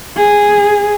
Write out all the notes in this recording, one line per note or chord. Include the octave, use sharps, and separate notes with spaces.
G#4